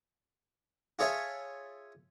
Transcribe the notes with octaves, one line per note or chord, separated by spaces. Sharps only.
F4 G#4 A4 C#5 E5